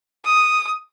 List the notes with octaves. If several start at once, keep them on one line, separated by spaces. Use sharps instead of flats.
D#6